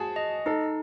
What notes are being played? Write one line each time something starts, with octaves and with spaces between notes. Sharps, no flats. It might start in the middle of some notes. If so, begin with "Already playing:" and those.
Already playing: F#4 G#4 A5
D#5
D#4 A4